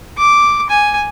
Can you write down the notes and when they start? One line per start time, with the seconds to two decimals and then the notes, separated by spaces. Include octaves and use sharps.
0.18 D6
0.70 G#5